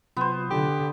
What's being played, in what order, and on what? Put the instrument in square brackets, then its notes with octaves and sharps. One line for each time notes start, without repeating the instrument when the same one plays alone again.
[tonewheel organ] C3 F#3 F4 [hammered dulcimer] B3 C5
[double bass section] D3 [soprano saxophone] G4